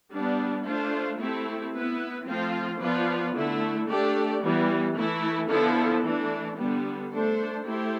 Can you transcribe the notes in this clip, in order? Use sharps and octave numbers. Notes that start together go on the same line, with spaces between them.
G3 B3 D4
A3 D4 F4 C5
A3 C4 E4 G4
B3 E4 B4
F3 A3 C4 F4 C5
F3 B3 F4 B4 D5
D3 A3 E4
A3 D4 G4 D5
E3 G3 B3
E3 A3 E4
D3 F3 B3 E4 A4
E3 A3 D4
D3 G3 B3
A3 D4 A4 C5
A3 E4 G4 C5